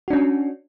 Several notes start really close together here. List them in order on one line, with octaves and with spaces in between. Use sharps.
F#4 D4 C#4